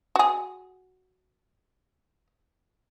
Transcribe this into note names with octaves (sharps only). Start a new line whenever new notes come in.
F#4 G#4